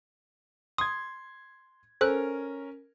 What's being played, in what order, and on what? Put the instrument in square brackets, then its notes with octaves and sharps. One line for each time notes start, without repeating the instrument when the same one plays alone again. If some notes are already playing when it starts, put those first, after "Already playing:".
[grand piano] C6 G#6 [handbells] D#6
[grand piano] C#4 A#4 [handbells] A4 C5 F#6